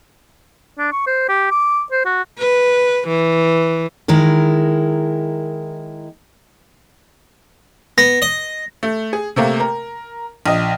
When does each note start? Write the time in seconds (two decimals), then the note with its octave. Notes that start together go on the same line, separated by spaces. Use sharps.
0.79 D4
0.92 C#6
1.07 C5
1.29 G4
1.51 D6
1.92 C5
2.05 F#4
2.38 B4
3.08 E3
4.08 D#3 G#3 E4 A#4
7.98 B3 A#6
8.22 D#5
8.83 A3
9.13 G#4
9.36 C3 A3 A#3
9.60 A#4
10.46 A#1 D#5